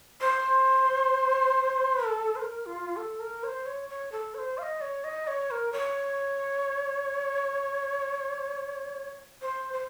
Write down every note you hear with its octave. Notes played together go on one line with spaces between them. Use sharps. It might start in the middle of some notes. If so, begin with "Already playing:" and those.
C5
A4
C5
A#4
F4
A4
A#4
C#5
C5
C#5
C#5
A4
C#5
C5
F5
D#5
C#5
D#5
C#5
A#4
C#5
C5
C5